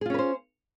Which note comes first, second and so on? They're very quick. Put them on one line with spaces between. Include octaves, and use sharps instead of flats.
G#4 F4 C#4 B4 C5